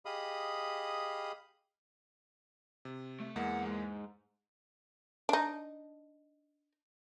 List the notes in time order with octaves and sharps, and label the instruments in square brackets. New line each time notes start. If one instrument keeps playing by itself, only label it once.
[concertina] G4 G#4 D#5 F5 B5 D#6
[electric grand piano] C3
[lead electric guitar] A3
[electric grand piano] E2 G#3 A#3 [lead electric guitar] F#5
[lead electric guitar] F2 G#2
[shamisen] D4 D#4